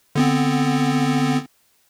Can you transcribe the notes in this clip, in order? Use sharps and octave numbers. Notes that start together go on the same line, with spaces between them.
D3 B3 C4